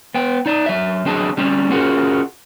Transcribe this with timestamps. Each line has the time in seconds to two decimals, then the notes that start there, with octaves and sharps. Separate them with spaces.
0.14 B3 G5
0.46 D#4 D5
0.66 F#3 E5
1.06 F#3 C4 D4 G#4 D#5 A5
1.37 G3 C4 C#4
1.71 C#4 F4 F#4 G#4 A#4